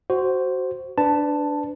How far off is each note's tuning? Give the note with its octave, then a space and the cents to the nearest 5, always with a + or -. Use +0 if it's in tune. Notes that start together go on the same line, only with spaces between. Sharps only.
F#4 +15 C5 +0
D4 +0 B4 +25 A5 +5